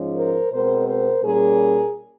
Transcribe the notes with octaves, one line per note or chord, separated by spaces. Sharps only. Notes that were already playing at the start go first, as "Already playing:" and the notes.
Already playing: G#2 F3 G#3 C#4
A#4 C5
B2 G#3 C4 A#4 C5
A#4 C5
A#2 G3 A#3 C#4 G#4 A#4